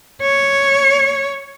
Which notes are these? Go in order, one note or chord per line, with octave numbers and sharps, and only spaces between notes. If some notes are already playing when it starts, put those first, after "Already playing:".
C#5